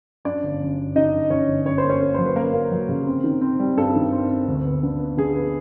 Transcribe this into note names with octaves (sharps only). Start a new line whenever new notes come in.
F#2 D4 D5
G1
F#2
G1
D3 D#4 D#5
F#2
D3 C#4 C#5
G1
F#2 C#5
C5
A#3
C#4 C#5
A#3
F#3 C5
B4
F#2 A#3 A#4
A#3
F#3
C#3
C4
D#3
C4
G3
G2 A4
D#3
C4
C4
D2
B3
D3
B3
D3 G#4
B3